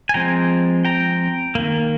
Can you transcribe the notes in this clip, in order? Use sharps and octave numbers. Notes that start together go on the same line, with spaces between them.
G#5
F3 G#3 C4 G5 A#5
G5 A#5
D#3 A#3